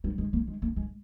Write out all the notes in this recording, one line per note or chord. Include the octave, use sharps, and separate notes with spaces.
G3
G#3
A#3
G#3
A#3
G#3